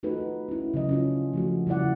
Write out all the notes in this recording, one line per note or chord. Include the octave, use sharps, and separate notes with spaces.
A3 D#4 F4 F#4 A4 B4
C#4 E4
C#3 F#3 D#5
C#4 D4 F4
F3 A3 F#4
C#3 G3 E4 D5 F#5